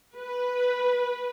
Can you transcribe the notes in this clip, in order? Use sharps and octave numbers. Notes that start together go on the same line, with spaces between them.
B4